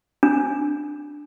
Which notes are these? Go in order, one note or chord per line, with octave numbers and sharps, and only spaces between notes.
D4